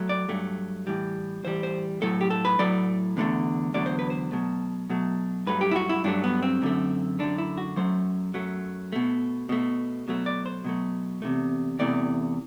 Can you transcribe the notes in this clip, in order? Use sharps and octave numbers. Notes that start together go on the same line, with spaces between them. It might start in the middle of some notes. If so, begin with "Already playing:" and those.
Already playing: F#3 A3
D5
G2 F#3 A3
A2 E3 G3
A2 E3 G3 C5
C5
A2 F#3 A3 A4
G4
A4
B4
A2 F#3 A3 D5
E2 D3 F#3 A3
E2 D3 F#3 A3 D5
C5
B4
C5
B2 F#3 A3
B2 F#3 A3
G2 F#3 A3 B4
G4
E4
F#4
E4
G2 F#3 A3 D4
B3
C4
F#2 D3 A3
F#2 D3 A3 D4
E4
F#4
F#2 F#3 A3 C5
F#2 F#3 A3
B2 A3
B2 A3
B2 F#3 A3
D5
C5
B2 F#3 A3
E2 C3 E3 A3
E2 C3 E3 A3 D5